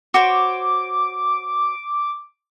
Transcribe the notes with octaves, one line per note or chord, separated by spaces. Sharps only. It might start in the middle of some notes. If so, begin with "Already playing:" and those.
F#4 C5 C#5 D6